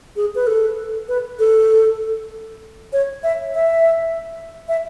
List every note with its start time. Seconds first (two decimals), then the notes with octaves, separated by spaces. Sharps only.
0.16 G#4
0.35 B4
0.47 A4
1.08 B4
1.39 A4
2.93 C#5
3.23 E5
3.54 E5
4.68 E5